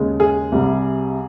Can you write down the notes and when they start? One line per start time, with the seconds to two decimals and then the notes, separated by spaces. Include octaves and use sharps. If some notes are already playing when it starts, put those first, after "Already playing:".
Already playing: D#2 C#3 G#3
0.20 G#4
0.52 C2 C3 G3